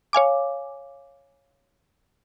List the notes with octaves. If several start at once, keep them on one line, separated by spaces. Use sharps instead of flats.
C#5 F5 G#5 D6